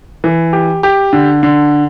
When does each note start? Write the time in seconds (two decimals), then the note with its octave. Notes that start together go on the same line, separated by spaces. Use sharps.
0.24 E3
0.53 G4
0.83 G4
1.13 D3
1.43 D3